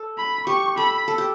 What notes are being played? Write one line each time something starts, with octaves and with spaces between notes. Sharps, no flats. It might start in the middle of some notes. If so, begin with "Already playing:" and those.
Already playing: A4
B5
G4 C#6
A4 B5
A4
G4